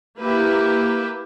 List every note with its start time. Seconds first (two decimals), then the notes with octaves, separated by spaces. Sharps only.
0.19 A#3 E4 G4 B4